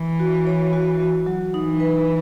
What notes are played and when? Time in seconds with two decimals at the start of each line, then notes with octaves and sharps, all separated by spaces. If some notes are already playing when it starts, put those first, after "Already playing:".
Already playing: E3
0.20 F#4
0.47 C#5
0.73 F#4
1.00 F#4
1.26 F#3
1.53 E3 D#4
1.80 B4